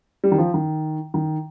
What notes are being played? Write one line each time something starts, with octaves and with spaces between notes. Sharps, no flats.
G3
D#3
F3
D#3
D#3